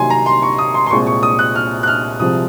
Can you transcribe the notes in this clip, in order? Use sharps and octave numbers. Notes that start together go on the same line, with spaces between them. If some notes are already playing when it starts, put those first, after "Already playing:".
Already playing: C2 C3 D#3 F#3 A#3 G#5 C6
A#5
C6
C#6
D#6
C6
C6
C2 A#2 G#3 C4 C#6
C#6
D#6
F#6
F6
F#6
F6
C2 C3 F3 G#3 C4 D#6